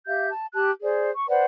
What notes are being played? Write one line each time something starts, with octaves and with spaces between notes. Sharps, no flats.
G4 E5 F5 G6
A5
G4 A5 F#6
G#4 C5 D5
C#6
B4 C5 D5 F#5